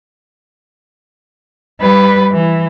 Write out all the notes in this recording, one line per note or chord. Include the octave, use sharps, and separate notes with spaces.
G3 B4
E3